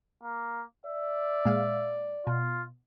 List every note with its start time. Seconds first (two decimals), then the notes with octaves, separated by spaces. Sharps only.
0.23 A#3
0.86 D5 E5
1.45 A#2 G#3 F5
2.27 B2 F4